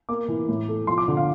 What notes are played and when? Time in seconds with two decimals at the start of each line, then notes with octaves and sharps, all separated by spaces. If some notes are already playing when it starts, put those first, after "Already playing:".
0.09 A#3 D6
0.28 E3
0.49 A2
0.69 A3
0.87 F3 C6
0.98 D6
1.08 D3
1.17 F5